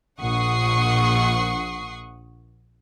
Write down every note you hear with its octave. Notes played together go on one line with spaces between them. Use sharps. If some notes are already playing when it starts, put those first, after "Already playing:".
A#1 F#5 C#6 D#6 C7